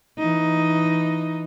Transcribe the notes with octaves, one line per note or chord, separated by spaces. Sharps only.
E3 D#4